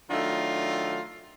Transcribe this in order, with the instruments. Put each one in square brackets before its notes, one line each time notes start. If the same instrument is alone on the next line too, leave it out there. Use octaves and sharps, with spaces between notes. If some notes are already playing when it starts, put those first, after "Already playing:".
[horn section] D#3 F#3 A3 D4 F4